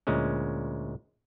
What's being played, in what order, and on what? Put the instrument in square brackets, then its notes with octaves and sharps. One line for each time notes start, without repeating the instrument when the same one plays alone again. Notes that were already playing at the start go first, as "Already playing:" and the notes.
[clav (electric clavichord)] D2 A#2 G#3 C#4